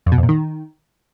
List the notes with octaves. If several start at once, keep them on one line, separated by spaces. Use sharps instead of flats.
F2
B2
F2
A#2
D#3